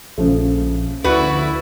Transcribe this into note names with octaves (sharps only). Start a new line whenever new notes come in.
A#1 C#3 F3 A3
D2 E4 F#4 B4 D5